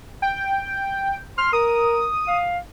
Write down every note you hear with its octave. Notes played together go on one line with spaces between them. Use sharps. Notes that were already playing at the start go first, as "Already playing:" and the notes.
G5
C6 F6
A#4 D#6
F5